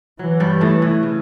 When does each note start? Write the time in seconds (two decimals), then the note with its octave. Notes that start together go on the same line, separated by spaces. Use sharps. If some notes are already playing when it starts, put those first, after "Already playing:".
0.19 E3 F#3
0.40 G2 G3
0.61 A2 A3
0.82 E3
1.03 C#3